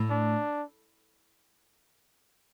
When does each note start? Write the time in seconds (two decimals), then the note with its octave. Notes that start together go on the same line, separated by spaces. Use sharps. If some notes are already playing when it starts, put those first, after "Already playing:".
Already playing: A2
0.11 D4